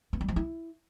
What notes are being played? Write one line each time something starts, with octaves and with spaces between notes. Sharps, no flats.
B3
G3
F3
E4